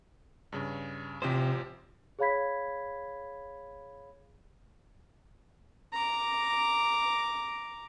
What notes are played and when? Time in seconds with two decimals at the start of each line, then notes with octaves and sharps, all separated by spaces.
0.52 G2 C#3
1.22 A1 C3 F3 G4 C5
2.19 G#4 C#5 F5 B5 G#6 B6
5.93 A#5 D6